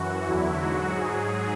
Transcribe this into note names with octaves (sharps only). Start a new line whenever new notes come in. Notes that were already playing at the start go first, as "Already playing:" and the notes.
Already playing: F#2 E3 F#4
E2 D3 F#3 E4
G#2 F#3 F#4
G#2 F#3 G#4